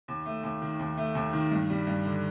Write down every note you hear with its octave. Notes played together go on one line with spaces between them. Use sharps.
D#2
A3
D#2
D#3
D#2
A3
D#2
D#3
G2
G3
G2
D3